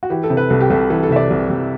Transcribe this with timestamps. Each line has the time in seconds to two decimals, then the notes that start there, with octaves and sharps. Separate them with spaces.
0.03 F#4
0.10 E3 G4
0.24 A4
0.30 C3
0.37 B4
0.50 C2 A4
0.60 G4
0.70 C2 A4
0.90 E3 A4
1.03 A4
1.10 C3 E5
1.16 D5
1.30 C2
1.50 C2